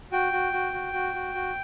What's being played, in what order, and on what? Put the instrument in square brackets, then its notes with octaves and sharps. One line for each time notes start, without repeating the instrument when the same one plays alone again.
[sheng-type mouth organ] F#4 G5
F#4
F#4
F#4
F#4
F#4
F#4